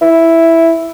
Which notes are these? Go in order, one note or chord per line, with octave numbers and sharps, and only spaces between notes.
E4